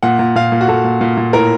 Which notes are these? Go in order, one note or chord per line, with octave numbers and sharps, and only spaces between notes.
A#2 F#5
A#2
A#2 F5
A#2
F#4
A#2 A4
A#2
A#2
A#2
A2 A#4